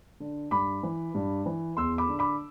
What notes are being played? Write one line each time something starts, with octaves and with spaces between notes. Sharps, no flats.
D3
G2 B5 D6
E3
G2
E3
E2 C6 E6
B5 D6
D3
B5 D6